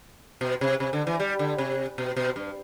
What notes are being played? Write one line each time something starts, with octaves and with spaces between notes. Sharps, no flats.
B2
C3
C3
D3
E3
G3
D3
C3
B2
B2
G2